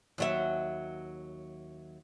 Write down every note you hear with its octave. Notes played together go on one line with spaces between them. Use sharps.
D#2 F#3 E5